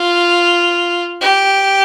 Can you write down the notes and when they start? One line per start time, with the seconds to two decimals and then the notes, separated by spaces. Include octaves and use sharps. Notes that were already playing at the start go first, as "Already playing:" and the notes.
Already playing: F4
1.21 G4